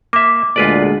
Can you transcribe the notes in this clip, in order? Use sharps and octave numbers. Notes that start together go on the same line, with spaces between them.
A#3 E5 D6
D2 A#2 G#3 F4 B4 D5